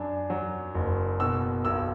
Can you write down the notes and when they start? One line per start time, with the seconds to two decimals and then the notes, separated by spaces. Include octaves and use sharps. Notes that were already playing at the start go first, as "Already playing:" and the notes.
Already playing: F#2 D4
0.30 F#3
0.75 F#1
1.20 B2 E6
1.65 B1 E6